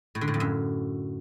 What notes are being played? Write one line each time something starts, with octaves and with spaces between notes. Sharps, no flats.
A2
D3
A2
F2
F#2